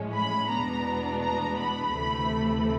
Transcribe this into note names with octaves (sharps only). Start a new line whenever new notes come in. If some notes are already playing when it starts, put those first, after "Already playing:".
Already playing: A2 F3 G#3 C#4
B5
E2 B2 G#3 B3 D4 A#5
A#5
B5
D2 C3 E3 A3